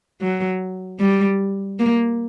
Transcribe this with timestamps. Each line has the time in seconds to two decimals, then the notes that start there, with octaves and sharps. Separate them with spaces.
0.22 F#3
1.00 G3
1.79 A#3